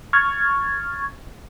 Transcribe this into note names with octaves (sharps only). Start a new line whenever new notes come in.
C#6 F6 G#6 A6